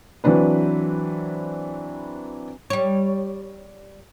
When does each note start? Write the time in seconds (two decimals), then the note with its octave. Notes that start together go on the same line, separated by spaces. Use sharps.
0.24 E3 F#3 C4 D4 B4
2.70 G3 C#5